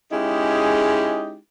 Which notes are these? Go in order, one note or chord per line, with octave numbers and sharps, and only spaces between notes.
G#3 C#4 D#4 E4 G4 G#4